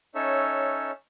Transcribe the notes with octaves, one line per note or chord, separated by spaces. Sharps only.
C#4 D#4 A4 C#5 E5